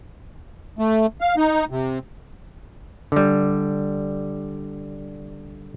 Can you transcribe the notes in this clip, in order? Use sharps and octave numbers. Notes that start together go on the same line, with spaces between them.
A3
F5
D#4
C3
D3 G3